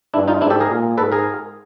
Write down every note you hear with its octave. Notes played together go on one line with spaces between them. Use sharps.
G2 D4 E4
D#4 F4
G#2 D4 E4
G4 A4
G#4 A#4
A#2
G#2 A4 B4
G#4 A#4